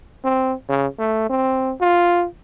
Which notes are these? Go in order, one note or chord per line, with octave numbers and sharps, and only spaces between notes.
C4
C#3
A3
C4
F4